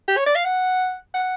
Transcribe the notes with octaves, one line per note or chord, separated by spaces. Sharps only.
G4
C#5
D5
F5
F#5
F#5